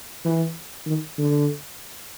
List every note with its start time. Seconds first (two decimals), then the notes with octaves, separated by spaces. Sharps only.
0.25 E3
0.86 D#3
1.18 D3